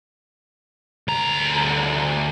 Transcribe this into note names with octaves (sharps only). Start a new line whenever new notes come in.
D2 A#5